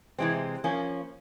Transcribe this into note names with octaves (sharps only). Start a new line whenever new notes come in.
C3 E3 G#3 C4
F3 A#3 C#4